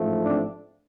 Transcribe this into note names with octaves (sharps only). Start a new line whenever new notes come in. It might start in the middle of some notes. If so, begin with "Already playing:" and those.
Already playing: A1 G#2 F3 A3
C4 D4